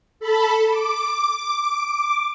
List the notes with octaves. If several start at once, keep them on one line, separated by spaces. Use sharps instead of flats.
A4 B5
D6